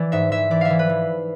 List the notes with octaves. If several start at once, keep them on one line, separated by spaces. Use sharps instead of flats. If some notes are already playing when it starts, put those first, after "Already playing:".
Already playing: E3 D5
G#2 E5
E3 E5
E3 D5
E5 F5
E3
B4
E3